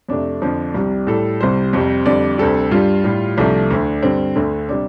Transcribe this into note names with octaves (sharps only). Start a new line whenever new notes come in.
F2 C3 A3 D4
F2 D3 F3
C2 C3 G3
A2 G3 A4
C2 C3 G3 C5
F2 C3 G3
F2 D3 G3 D5
D2 C3 G3 A4
G2 G3 F4
A2 G3
C2 C3 F3 A3 D4
D2 D3 A3
G2 D3 G3 C4
D2 D3 A3
C3 G3 D4